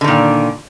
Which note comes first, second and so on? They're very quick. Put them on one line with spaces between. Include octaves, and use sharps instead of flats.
D3 D#3 A#2